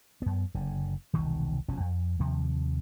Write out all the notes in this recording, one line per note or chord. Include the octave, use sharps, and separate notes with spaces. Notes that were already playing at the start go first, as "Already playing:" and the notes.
F#2 B3
F#1 D3
E1 C2 B2 D#3
F1 B2 F3 C#4
F2
D#2 C3 F3